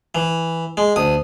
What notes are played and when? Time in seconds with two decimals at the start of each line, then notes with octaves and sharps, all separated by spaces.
0.15 E3
0.77 G#3
0.96 D2 D#6